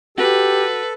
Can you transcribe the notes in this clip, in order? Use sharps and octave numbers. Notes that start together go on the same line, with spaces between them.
F#4 G4 A4 B4